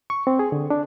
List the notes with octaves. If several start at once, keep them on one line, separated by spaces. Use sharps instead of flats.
C#6
C4
G#4
D3
D4